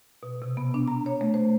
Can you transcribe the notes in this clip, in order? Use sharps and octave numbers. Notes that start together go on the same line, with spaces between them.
B2
C3
B3
D4
A#5
C#5
A3
C5